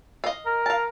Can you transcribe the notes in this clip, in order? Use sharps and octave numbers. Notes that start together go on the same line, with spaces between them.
D#5 F5
A#4
F5 A5